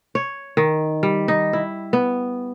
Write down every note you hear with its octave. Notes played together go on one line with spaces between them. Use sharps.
C#5
D#3
G3
D#4
E4
B3